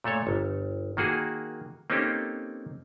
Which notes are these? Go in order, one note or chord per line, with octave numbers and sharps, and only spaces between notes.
A#2 A3 A4 C#5
G1
D#3 A#3 F#4 G#4
A#3 C4 C#4 D#4 G4 A4